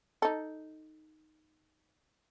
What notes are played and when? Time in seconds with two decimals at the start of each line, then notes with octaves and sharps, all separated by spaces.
0.22 D#4 A4